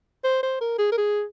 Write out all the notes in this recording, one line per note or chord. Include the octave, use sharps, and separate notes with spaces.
C5
C5
A#4
G#4
A#4
G#4